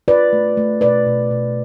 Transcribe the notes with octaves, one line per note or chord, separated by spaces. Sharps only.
F4 B4 D5
A3
A3
B2 B4 D5
B2
B2